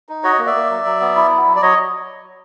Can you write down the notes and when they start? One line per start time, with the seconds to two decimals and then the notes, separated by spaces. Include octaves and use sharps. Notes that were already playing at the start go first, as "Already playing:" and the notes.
0.09 D#4
0.24 F#4 C#5 D#5
0.39 A#3
0.46 D5 E5
0.55 A#3
0.69 F#3
0.85 F#3
1.00 B3
1.16 E4
1.31 F#3
1.46 F#3
1.56 D5
1.62 F#3 C#5 D#5